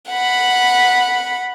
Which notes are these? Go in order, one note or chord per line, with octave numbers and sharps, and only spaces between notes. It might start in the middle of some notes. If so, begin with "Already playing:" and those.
F#5 B5